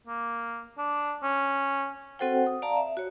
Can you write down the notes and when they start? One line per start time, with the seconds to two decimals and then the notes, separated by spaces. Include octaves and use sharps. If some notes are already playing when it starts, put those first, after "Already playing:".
0.07 A#3
0.78 D4
1.23 C#4
2.19 C4 F#4 A4 C5 F#5 G5
2.47 D#6
2.62 D5 F5 A5 A#5
2.76 E5
2.97 F#4 C#5